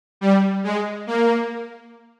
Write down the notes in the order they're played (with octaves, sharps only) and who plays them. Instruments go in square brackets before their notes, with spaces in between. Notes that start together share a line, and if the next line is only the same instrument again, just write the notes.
[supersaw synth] G3
G#3
A#3